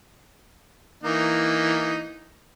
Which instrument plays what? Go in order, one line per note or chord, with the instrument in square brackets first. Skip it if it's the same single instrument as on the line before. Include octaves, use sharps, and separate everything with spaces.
[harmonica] E3 A#3 D#4